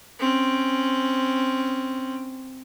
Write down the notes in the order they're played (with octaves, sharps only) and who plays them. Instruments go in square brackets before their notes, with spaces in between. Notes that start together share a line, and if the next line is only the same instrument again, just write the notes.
[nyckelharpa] C4 C#4